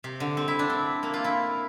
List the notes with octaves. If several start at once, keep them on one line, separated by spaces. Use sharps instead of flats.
C3
D3
C4
E4
D4
C4
A#3
F4
E4